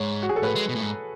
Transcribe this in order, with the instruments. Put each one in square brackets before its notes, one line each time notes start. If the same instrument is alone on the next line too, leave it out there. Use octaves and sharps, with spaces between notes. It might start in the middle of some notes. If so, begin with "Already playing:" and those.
Already playing: [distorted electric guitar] G#2 [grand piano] C#5
[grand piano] F#4
G#4
A4
[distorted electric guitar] A2 [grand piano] B4
[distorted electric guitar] G#3
B2
A2
G#2